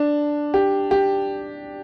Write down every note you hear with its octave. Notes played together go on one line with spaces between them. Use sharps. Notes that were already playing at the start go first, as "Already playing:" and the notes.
Already playing: D4
G4
G4